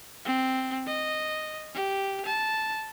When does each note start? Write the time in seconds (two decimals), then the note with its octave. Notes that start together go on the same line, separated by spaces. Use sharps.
0.25 C4
0.87 D#5
1.75 G4
2.25 A5